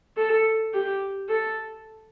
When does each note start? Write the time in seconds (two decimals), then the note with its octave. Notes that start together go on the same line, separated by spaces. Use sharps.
0.17 A4
0.74 G4
1.29 A4